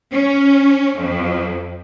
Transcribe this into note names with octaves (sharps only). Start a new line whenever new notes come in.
C#4
F2